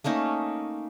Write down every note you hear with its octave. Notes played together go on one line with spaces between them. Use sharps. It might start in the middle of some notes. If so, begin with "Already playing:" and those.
A3 A#3 C#4 D#4